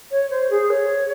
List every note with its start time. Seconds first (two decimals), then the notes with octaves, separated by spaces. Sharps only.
0.11 C#5
0.30 C5
0.50 G#4
0.70 C#5